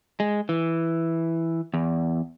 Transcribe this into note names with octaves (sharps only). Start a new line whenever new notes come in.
G#3
E3
E2